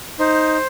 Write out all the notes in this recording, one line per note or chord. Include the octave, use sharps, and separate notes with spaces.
D#4 C5